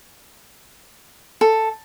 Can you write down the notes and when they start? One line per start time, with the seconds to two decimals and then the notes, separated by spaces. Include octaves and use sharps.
1.41 A4